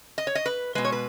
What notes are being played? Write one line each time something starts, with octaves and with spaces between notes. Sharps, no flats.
D#5
C#5
D#5
B4
B2 G#3 B4
C#5
B4